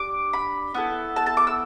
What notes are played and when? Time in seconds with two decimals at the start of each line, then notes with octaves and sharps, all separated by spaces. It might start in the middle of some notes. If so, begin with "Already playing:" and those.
Already playing: D4 G4 D6
0.33 B5
0.74 B3 E4 A4
1.16 A5
1.26 A5
1.37 D6
1.47 E6